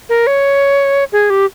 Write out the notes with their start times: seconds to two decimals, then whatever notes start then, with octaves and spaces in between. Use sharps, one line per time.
0.09 A#4
0.27 C#5
1.13 G#4
1.30 G4